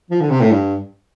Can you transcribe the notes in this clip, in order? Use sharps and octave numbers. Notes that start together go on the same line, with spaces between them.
F3
D3
C3
A2
G2